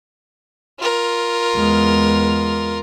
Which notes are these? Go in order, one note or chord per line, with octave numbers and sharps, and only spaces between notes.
F4 A#4
E2 G#3